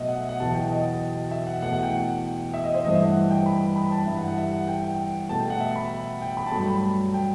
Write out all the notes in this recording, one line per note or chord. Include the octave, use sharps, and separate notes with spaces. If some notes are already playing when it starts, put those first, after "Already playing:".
Already playing: B2 F#3 A3 D#5 E5
F#5
E5
F#5
E2 B2 F#3 A5
G5
D#5
E5
F#5
E2 B2 A3 F#5
F#5
G5
F#5
E5
D#5
C5
G2 E3 A3 D#5
E5
F#5
F#5
G5
B5
B5
B5
A5
G2 E3 G3 E5
F#5
F#5
E5
F#5
G5
G5
B2 A3 A5
G5
F#5
E5
B5
G5
B5
A5
G2 F#3 A3 B5
B5
G5